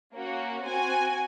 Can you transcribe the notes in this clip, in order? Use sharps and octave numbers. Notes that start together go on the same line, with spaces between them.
A#3 C#4 F#4
C4 F#4 G#5